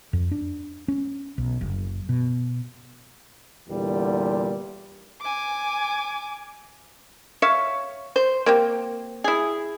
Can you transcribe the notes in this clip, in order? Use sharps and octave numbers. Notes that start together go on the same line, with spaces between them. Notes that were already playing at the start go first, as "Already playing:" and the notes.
F2
D4
C#4
B1
F#1
B2
E2 A#2 D3 G3
G#5 D6
C#5 E5 F5
C5
A#3 C4 G4
E4 G#4